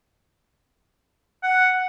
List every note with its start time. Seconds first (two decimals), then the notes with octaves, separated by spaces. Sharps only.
1.43 F#5